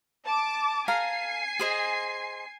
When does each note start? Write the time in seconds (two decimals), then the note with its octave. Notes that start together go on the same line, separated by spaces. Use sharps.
0.25 A5 D6
0.88 A4 F5 G#5 A#5 C7
1.59 G#4 C5 D#5